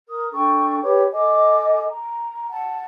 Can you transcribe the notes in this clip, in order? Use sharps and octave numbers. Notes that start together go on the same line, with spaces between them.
A#4 D#6
D4 A4 G5 C#6
G4 B4 C#5 D6
A4 D#5 G#5 D6
A#5
F#5 A5